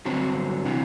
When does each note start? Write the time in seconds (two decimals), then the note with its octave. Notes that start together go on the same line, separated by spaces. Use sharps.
0.05 G2 D3 F#3 C4
0.66 C3 E3